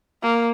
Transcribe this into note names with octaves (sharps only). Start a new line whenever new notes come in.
A#3